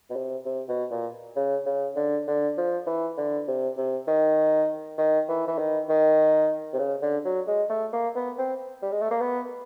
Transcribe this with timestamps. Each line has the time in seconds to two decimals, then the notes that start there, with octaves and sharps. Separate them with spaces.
0.10 B2
0.16 C3
0.45 C3
0.69 B2
0.91 A#2
1.36 C#3
1.66 C#3
1.96 D3
2.27 D3
2.57 F3
2.87 E3
3.18 D3
3.48 C3
3.77 C3
4.07 D#3
4.98 D#3
5.28 E3
5.48 E3
5.58 D#3
5.89 D#3
6.73 C3
6.79 C#3
7.02 D3
7.25 F#3
7.47 G#3
7.70 A3
7.93 A#3
8.16 B3
8.38 C4
8.82 G3
8.92 G#3
9.01 A3
9.11 A#3
9.21 B3